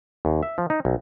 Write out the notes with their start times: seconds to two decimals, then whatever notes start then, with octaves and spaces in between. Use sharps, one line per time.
0.25 D#2
0.43 E5
0.58 F3
0.70 D#4
0.85 B1